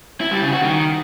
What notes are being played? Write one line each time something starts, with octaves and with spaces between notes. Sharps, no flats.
E4
G3
C#3
F#4
D#3